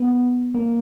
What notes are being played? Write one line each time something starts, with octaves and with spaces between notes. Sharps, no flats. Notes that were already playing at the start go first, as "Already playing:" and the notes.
Already playing: B3
A#3